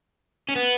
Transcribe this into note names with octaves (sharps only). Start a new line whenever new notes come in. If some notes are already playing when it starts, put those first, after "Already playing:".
C#4
B3